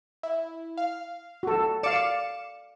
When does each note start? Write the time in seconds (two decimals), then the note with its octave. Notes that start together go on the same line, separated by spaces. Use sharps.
0.23 E4
0.77 F5
1.43 F#4 A4
1.83 D5 F5 D6 C#7 E7